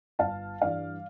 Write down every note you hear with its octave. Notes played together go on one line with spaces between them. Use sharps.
G1 F5 A5
G2 E3 G3 D5 F5